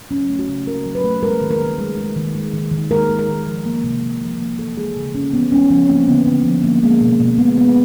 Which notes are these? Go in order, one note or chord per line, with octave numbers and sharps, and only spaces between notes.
F#3 C#4
A3
F#4
C#3
C#3 A#4
F#3
B4
A3
G#3 A#4
D#3
A#4
D#3
G#3
G#3
D#3
G#3
D#3
D#3
G#3 A#4
G#3
A#4
D#3
F3
A#3
C3
C3
F3
A#3
E3 A4
G#3 G#4
C#3
C#3 C#4
E3 B3
G#3 C#4
F3 C#4
A#3 C4
D3 B3
D3
F3
A#3
G#3 A#3
B2
B2
G#3 B3
G#3 B3